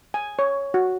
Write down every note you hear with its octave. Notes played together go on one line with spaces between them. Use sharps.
G#5
C#5
F#4